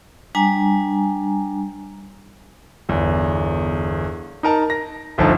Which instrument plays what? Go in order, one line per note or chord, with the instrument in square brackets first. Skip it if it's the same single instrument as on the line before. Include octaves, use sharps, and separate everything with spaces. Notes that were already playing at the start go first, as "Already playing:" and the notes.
[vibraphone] G3 D4 G#5 A#5
[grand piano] G1 E2
D#4 A#4 A5
A#6
G1 D2 F3 D#4 A5